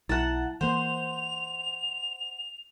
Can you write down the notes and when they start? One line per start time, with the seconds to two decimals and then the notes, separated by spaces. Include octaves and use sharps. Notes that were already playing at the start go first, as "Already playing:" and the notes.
0.09 B1 E4 F#5 A5
0.61 E3 A#3 C5 F#5 F7